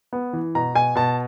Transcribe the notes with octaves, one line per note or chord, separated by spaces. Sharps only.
B3
E3
B2 A#5
B2 G#5
B2 A5